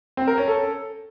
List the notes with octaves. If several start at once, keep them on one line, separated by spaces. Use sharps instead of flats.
C4
A#4
C#4
A4